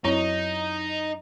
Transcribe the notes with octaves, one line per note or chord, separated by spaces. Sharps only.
F#2 C4 D#4 E4 C#5